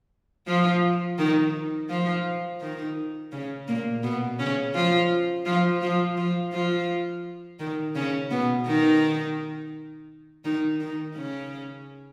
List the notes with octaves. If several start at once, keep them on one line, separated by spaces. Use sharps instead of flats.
F3 F4
D#3 D#4
F3 F4
D#3 D#4
C#3 C#4
A#2 A#3
B2 B3
C#3 C#4
F3 F4
F3 F4
F3 F4
F3 F4
F3 F4
D#3 D#4
C#3 C#4
B2 B3
D#3 D#4
D#3 D#4
D#3 D#4
C#3 C#4